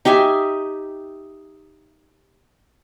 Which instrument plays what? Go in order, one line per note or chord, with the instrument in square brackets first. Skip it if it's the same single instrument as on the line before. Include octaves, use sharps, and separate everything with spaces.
[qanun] D#4 G4 E5 G#5